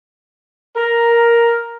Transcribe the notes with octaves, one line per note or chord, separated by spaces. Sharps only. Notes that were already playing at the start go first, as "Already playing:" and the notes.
A#4